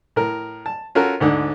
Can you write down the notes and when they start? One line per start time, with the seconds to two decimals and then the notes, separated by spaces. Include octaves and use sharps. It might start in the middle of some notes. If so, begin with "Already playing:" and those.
0.16 A2 A#4
0.66 A5
0.95 C#4 F4 F#4 A4 A#4
1.20 D2 G#2 D3